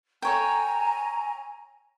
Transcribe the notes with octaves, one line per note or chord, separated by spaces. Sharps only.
A4 C#5 G5 G#5 A#5